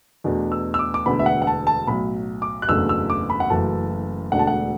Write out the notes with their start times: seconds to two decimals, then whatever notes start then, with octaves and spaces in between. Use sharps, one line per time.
0.24 E2 B2 A3 D4
0.52 E6
0.74 E6
0.79 D6
0.94 D6
1.06 E1 D2 D3 B3 B5
1.19 E5
1.26 F#5
1.42 F#5
1.47 A5
1.67 A5
1.87 B1 A2 F#3 B5
2.42 D6
2.62 F#6
2.68 F#1 E2 B2 A3 D4 E6
2.89 E6
3.10 D6
3.30 B5
3.40 F#5
3.50 F#1 F#2 E3 A3 A5
4.32 E1 D2 D3 A3 D4 F#5
4.39 A5
4.47 F#5